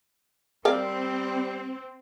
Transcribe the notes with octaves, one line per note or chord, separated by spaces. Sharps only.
G3 C4 A#4 D5 F5